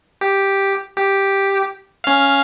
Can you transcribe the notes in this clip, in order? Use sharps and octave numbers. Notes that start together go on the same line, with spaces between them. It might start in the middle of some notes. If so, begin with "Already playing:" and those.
G4
G4
C#4 F5